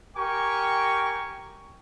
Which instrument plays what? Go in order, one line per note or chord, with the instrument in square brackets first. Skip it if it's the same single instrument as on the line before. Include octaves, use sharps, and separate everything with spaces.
[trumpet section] G4 A#4 G5 G#5 C#6